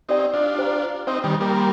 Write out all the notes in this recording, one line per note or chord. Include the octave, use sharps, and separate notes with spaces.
C4 D#4 G4 D5 G5
D4 F4
G4 C5 G5 A#5
C4 D#4 C5 G5 C6
D#3 G3
G3 A#3
C6